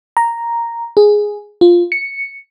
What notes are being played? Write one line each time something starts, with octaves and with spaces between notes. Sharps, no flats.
A#5
G#4
F4
C#7